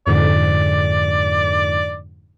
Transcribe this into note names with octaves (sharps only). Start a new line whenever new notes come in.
F2 G#2 D3 D5